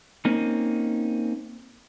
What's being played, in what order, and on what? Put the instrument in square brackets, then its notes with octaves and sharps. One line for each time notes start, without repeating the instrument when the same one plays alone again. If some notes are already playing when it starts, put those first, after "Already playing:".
[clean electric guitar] A#3 C4 C#4 D#4